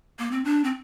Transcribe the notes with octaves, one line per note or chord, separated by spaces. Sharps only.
A#3
C4
D4
C4